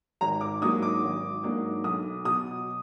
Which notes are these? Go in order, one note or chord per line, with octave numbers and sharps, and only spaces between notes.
G#1 A#5
D6
G#2 F#3 A#3 D4 D#6
D6
G#1
G#2 F#3 A#3 D4
B1 D#6
B2 F#3 D#6